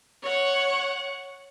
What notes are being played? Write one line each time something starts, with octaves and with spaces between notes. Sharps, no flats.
C#5 F#5